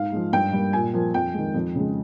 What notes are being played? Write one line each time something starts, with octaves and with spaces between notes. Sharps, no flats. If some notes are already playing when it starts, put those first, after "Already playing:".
Already playing: G#2 F5
F3 G#3
G2 G5
G3 A#3
A#2 G#5
F3 A#3
F2 G5
D#3 G#3
F2
C#3 G#3